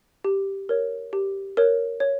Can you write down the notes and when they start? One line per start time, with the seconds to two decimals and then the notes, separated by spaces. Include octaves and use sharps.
0.24 G4
0.69 A#4 C#5
1.13 G4
1.57 A#4 C#5
2.00 C#5